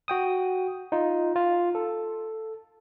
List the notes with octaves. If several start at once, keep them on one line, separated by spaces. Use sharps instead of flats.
F#4 G5 D#6
D#4 F4
F4
A4